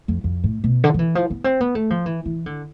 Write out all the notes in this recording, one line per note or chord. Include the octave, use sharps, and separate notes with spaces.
F2
F2
A2
B2
D3
F3
E3
F3
B3
C4
B3
A3
F3
E3
E3
D3